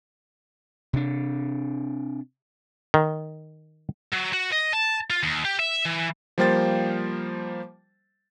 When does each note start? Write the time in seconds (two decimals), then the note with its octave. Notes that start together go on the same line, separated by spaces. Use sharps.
0.93 C3 D4
2.94 D#3
4.13 F#3
4.33 F#4
4.53 D#5
4.73 A5
5.10 F4
5.23 D#2
5.45 G4
5.59 E5
5.85 E3
6.38 F3 G3 A#3 C5 G5 A6